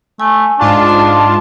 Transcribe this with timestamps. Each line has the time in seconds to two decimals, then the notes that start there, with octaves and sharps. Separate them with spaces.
0.20 A3 G#5
0.59 G#2 D4 F4 A5
0.87 D#4 C6